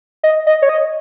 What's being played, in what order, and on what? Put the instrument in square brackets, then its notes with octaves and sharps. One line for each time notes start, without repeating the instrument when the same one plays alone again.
[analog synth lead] D#5
D#5
C#5
D#5